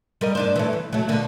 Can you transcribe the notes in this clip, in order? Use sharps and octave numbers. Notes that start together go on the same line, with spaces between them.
G3 A#4 D#5
G2 D4 C5
E3 F#3 A3
E2
F#3 A3
B2 D3 A#3